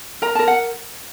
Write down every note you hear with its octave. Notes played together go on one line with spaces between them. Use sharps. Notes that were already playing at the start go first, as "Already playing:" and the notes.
A#4 A#5
A5
A#4
F#5